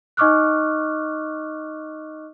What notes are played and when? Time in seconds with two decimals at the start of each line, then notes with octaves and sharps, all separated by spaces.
0.17 D#4 D#5 C#6 D6 F6 F#6